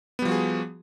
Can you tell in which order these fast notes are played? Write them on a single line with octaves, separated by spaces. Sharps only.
B3 G3 F3 F#4 G#4